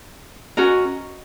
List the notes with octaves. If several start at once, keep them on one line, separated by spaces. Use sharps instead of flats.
C#4 F#4 A#4 D#5